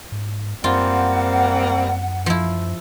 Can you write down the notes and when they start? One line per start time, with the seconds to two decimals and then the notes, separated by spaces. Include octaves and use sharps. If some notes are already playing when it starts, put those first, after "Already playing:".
0.12 G#2
0.64 F#2 G3 A#3 C4 F4 F#5
2.26 F3 E4